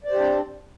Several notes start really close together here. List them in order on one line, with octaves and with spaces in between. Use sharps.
D5 C5 G4 D4 C4